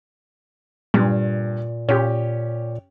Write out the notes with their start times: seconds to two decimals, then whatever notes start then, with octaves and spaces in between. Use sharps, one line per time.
0.94 G2 A#2
1.89 A#2 C#4 G4